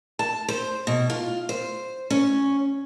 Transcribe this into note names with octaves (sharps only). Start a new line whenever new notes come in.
A5
C5
B2
F4
C5
C#4